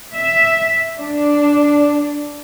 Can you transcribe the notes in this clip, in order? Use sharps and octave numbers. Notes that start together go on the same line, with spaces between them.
E5
D4